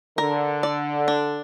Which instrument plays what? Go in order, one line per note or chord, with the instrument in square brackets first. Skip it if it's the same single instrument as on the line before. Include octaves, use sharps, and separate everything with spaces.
[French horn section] D3 [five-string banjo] A#4
[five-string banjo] D5
D4